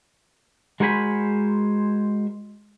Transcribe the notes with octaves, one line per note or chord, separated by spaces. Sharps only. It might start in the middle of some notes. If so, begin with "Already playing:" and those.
G#3 F#4 A#4 C5 G#5 B5